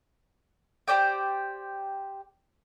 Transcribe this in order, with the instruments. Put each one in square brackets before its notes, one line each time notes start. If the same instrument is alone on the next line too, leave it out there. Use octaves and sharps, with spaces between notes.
[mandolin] G4 C5 D5 G5